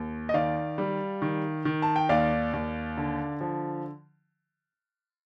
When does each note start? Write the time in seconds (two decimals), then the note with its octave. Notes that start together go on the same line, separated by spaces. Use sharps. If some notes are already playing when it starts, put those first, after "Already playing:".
Already playing: D#2
0.29 D#5
0.34 D#3 D5 F5
0.78 G3
1.22 D#3
1.65 D#3
1.82 A5
1.96 G5
2.09 D#2 D5 F5
2.53 D#2
2.97 D3
3.41 F3